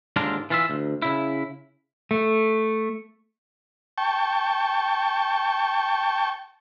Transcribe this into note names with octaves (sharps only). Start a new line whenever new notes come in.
D#2 G#2 D3 D4 F4 A#4
E3 F4 E5
D2
C#3 E4
A3
G5 A5 C#6